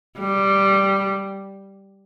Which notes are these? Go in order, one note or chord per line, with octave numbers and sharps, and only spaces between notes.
G3